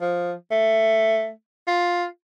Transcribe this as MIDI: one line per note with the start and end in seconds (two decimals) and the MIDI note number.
0.01 0.33 53
0.51 1.30 57
1.67 2.05 65